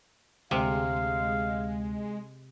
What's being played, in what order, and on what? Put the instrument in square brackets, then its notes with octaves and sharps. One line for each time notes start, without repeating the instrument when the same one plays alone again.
[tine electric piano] D2 [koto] C3 [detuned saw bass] G#3 [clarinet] F5